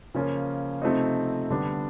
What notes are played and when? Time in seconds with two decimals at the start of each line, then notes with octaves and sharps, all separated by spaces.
0.14 C#3 F3 A#3 C#4 F4
0.82 C3 F3 A3 C4 D#4
1.50 D3 G3 B3 D4